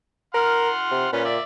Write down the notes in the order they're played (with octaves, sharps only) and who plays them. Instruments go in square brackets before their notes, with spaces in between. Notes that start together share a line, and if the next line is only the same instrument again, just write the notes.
[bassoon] A#4 [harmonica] F#5 C6 F6
[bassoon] C3
[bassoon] A#2 [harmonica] C#4 F4 B4
[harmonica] D5 E5